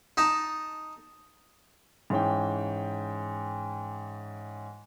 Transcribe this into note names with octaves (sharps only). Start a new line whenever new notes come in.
D#4 A5
G#2 E3 C#4 G5